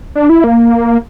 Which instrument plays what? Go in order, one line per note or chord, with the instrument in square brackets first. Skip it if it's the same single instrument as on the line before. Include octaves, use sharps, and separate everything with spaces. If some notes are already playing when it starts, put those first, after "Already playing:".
[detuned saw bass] D4
E4
A#3